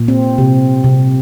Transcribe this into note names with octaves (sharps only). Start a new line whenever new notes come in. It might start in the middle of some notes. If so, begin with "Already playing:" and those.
Already playing: A#2
C4
C3
C3